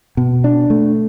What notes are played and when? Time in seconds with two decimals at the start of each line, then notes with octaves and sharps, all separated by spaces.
0.17 B2
0.44 D4
0.70 A3